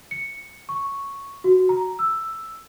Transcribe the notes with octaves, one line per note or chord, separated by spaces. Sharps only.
C#7
C#6
F#4
A#5
E6